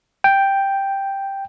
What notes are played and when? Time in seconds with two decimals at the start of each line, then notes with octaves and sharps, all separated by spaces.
0.24 G5